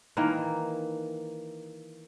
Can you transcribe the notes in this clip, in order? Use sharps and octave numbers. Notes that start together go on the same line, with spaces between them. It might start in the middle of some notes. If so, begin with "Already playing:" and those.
D#3 E3 A#3